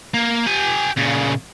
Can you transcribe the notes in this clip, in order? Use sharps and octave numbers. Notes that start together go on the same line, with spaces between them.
A#3
G4 G#5
A#2 C#3